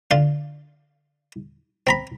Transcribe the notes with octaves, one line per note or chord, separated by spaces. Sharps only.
D3 F4 F5
C4 A#5 B5